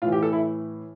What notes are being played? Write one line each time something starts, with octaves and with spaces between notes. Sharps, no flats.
A2 E3 F4
G4
A4
E4